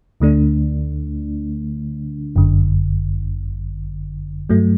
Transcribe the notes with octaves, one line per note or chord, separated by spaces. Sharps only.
D2 D3 A3 D4
G1 F#2 D3
G2 F#3 A3